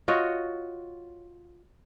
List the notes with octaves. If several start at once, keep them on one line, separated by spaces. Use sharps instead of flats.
F4 F#4 C#5 D#5